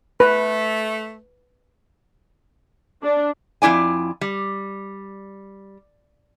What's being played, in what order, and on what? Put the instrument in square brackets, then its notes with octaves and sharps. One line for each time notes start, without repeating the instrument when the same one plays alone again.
[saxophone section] A3 [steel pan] B4
[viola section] D4
[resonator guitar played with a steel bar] F2 G#3 E4 D5 G#5
G3